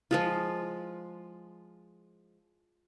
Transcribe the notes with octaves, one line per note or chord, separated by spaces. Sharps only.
F3 G#3 F4